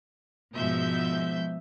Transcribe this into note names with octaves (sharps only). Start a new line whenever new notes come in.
G#2 B2 F3 E5 G6